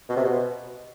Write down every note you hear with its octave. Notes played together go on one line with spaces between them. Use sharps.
B2
C3
B2